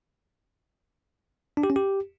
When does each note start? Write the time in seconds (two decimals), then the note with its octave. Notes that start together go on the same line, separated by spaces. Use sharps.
1.57 D4
1.63 G4
1.70 C#4
1.76 G4